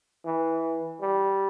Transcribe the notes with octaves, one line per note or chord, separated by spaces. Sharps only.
E3
G3